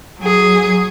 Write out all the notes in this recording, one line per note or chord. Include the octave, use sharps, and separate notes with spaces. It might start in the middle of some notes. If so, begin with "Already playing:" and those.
F#3 G#4